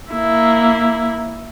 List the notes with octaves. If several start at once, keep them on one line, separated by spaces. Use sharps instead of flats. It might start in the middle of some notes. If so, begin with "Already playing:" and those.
A#3 E4